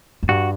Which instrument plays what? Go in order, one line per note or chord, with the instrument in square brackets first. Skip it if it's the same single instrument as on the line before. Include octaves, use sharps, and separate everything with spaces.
[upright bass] F#2
[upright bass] G2 [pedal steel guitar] F#4